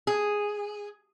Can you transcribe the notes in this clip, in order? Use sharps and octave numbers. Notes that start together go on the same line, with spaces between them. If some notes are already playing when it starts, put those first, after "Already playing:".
G#4